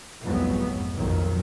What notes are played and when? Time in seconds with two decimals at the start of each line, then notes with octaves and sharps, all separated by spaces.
0.23 F1 C2 F2 G#2 F#3 B3
0.97 B1 F2 A#2 D#3 F#3